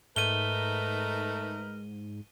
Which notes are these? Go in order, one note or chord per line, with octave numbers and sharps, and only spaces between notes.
G#2 A3 D#4 A#4 B4 D#7 G7